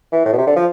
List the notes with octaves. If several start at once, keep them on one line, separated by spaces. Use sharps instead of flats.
E3
A2
B2
C3
D3
F3